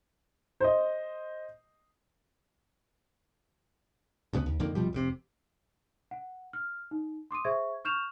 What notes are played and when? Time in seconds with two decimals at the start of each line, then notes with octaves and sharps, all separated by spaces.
0.60 C5 D#5
4.33 D2 C#3 G3 B3
4.46 D#2
4.60 F2 D3 D#3 A#3
4.75 F1 B2 F3 G3
4.93 F1 G#2 C3
6.11 F#5
6.53 F6
6.91 D#4
7.31 C6 D6 D#6 D#7
7.45 G#4 C5 E5 C#6 G#6
7.85 C#6 F6 G6 E7 F7